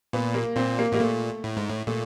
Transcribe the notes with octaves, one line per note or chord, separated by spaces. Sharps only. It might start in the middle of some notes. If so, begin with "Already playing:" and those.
A#2 B3
A#3
A#2 C4
A#3
A2 A#3
A#2 A3
A2
G#2
A2
A#2 A3